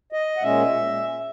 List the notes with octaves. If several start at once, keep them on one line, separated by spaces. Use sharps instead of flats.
D#5
F#5
A#2 G#3 C#4 E5